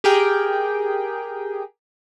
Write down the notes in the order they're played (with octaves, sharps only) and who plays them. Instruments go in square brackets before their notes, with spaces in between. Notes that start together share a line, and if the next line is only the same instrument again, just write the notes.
[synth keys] G4 G#4 A#4 G5